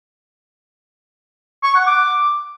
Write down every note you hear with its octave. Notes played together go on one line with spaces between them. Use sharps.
C#6
F#5
D6